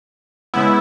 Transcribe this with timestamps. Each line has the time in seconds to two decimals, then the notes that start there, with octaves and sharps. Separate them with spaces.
0.54 C#3 G#3 B3 E4